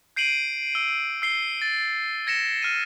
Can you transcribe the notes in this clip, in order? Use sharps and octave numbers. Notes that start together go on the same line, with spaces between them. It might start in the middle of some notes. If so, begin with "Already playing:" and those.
G6 C7 D7 D#7 F#7
E6
E6 C7 G7
A6
G#6 A#6 C#7 E7
F6 D#7